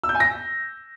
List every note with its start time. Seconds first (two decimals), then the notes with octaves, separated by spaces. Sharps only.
0.04 E6
0.09 G6
0.15 G#5
0.20 A#6